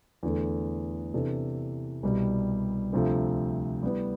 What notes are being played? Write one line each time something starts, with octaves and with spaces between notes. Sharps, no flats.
E2 D3 A3
C3 E3 B3 D4 A4
C2 B2 G3
D2 C3 F3 A3
G3 B3 E4